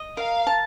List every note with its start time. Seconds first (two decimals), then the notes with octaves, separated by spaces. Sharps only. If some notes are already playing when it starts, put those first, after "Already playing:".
Already playing: D#5
0.17 A#4 F5
0.47 A5